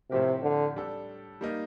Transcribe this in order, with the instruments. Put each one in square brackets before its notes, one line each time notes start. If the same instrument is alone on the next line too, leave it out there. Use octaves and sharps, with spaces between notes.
[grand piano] A2 F3 C4 G4 A#4 [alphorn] C3
[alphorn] D3
[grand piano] G3 D4 A4
G3 A#3 D#4